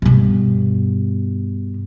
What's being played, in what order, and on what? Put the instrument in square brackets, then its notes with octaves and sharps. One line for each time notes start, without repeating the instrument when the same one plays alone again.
[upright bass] G2 B2